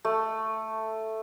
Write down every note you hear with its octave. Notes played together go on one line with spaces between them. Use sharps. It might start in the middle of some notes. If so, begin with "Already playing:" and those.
A3